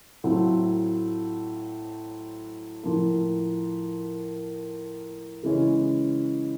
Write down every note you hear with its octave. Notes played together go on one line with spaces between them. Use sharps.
A2 F#3 A3 C4 F4
A2 F3 A#3
C#3 E3 G#3 C#4